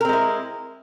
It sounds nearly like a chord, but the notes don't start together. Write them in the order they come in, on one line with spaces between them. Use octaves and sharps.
A#4 C4 G#3 E4